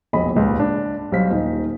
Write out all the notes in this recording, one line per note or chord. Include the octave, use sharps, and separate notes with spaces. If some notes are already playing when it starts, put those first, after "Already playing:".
E1 A#1 F2 D#5 B5
D#1 C#2 G#2
D4
B1 G3 C5 F5 B6
D#1 D#4